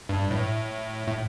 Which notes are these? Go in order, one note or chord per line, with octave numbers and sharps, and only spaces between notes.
G2
A2
A2